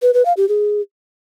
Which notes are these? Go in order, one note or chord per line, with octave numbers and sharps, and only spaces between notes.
B4
B4
F5
G4
G#4